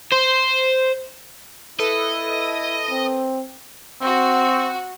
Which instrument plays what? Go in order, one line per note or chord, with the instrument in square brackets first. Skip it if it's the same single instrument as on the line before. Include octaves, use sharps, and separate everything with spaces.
[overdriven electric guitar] C5
[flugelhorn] E4 [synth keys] A4 B4 [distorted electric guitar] D#5
[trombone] C4
[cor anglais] C4 [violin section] F#4